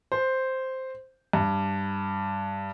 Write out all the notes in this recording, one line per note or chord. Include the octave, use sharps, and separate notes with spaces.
C5
G2